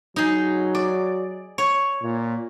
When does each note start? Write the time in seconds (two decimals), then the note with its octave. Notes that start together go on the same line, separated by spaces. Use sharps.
0.16 F#3 D#4 G#4
0.75 D5
1.58 C#5
2.03 A#2